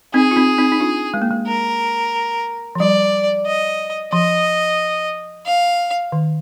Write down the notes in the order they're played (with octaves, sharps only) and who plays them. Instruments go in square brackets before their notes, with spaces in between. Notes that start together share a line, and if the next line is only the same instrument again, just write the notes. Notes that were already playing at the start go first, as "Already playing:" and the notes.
[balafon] C4 D#4 [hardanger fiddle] G#4
[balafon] F4
C4 D#4
C4 D#4
D#4
D4 F4
G#3
A#3
G#3
[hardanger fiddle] A#4
[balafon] F3
[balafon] G3 [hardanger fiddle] D5
[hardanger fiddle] D#5
[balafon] F3 [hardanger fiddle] D#5
[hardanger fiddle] F5
[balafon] D#3